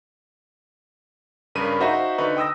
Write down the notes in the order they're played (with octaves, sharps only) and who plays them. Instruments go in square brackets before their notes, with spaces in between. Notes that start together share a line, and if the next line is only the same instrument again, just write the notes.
[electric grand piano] G2 C#3 A#4 B5 D#7
D#4 F#4 C5 E5 F5 A#5
D3 D#4 B4 C#6
G5 D#6 E6 A#6